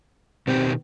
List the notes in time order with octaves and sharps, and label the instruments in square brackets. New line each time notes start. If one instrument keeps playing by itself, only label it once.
[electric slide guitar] B2 D#3 G4 [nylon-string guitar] C4